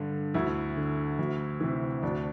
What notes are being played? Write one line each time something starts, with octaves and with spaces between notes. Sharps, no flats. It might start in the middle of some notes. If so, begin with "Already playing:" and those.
Already playing: G2 D3
D2 E4
D3
D2
C3 E3
D2 D4